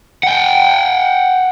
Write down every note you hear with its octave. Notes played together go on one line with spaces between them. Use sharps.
F#5 G5